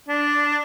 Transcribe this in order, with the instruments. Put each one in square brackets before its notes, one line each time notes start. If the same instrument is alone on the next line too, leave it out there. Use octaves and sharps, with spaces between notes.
[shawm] D4